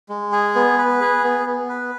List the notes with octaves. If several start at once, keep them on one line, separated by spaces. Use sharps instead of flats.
G#3
G#4
B3
B4
G#4
B3
B3
B4